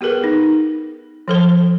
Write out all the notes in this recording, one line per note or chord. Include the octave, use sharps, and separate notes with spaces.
B3 G4 G#4 A#4 B4
D#4
F3 A4 C5